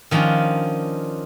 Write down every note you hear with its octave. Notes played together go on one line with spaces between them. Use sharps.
D#3 F3 C#4 D4 F4